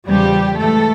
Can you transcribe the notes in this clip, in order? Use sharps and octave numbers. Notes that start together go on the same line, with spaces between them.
E2 C#3 F3 G3 G4
G#2 E3 A3 A4